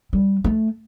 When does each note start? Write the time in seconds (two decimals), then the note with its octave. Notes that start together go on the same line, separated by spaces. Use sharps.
0.13 G3
0.44 A3